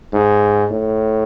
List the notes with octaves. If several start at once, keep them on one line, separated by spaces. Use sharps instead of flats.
G#2
A2